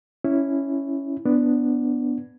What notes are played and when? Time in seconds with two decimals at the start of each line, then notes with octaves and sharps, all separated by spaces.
0.24 C#4 E4
1.26 B3 D4